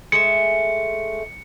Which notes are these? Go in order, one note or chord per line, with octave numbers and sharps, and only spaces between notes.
G#3 A3 E5 C#7